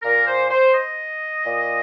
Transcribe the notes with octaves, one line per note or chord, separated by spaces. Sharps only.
A#2 A#4
C5
C5
D#5
A#2